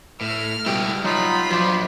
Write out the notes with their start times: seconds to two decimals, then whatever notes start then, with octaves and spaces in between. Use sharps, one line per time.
0.21 A2 F6
0.66 C#2 B2 G3 E4 G5
1.04 F#3 D#4 F4 B5
1.50 F3 F#3 D4 C5